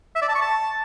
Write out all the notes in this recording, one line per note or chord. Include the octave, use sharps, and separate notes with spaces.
E5
D5
A5
C#6
A5